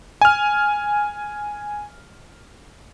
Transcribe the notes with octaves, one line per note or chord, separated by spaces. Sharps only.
G#5 F6